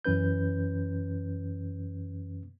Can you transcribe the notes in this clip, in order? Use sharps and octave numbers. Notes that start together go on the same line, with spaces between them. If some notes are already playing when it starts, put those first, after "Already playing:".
F#2 E3 C#4 B4 G6